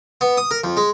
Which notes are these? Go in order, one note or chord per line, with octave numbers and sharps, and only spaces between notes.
B3
D#6
A#4
F2
G#3